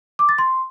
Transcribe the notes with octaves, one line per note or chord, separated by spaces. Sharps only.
D6
A6
C6